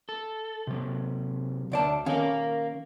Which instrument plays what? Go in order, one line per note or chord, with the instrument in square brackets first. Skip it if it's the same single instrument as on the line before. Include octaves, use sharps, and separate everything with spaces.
[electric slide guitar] A4
C3 F#3
[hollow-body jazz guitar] D2 D5 A5
[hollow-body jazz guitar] D#3 C#4 [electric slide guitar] A#4 F5